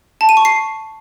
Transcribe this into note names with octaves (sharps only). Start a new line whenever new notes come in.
A5
D#7
C#6
C7